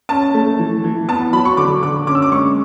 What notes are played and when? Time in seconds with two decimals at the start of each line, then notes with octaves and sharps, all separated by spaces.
0.09 C#4 A5
0.34 A3
0.59 E3
0.84 E3
1.09 B3 A5
1.33 F#3 B5
1.45 C#6
1.57 D3 D6
1.83 D3 D6
2.07 C#4 D6
2.15 E6
2.22 D6
2.32 G#3 C#6